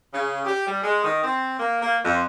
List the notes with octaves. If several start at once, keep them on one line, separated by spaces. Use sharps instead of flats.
C#3
G4
G3
G#3
D#3
C4
A#3
A#3
F2